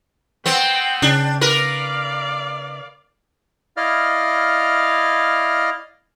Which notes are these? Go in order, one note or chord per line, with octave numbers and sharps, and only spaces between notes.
B3 C4 G5
C#3 D4
A#4 B4 D5 F5
E4 D5 D#5 F5 F6